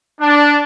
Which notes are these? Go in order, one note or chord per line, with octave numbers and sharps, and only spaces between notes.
D4